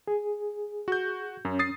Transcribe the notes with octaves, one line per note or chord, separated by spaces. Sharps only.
G#4
F#4 G6
F#2 C#4
D#6 A6 C7